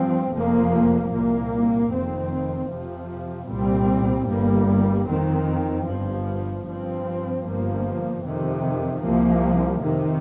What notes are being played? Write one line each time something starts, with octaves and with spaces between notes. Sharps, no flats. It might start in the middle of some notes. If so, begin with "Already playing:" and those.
Already playing: G2 F3 C4
F1 F2 F3 A#3
C2 A#2 A#3
F1 F2 D#3 C4
F2 C3 F3
C2 A#2 G3 C4
G1 G2 G3 A#3
F2 D#3 C4
G1 G2 F3
G2 F3 C4
G1 G2 F3 A#3
F2 C3 D#3
C2 C3 F3 A#3
F2 C3 D#3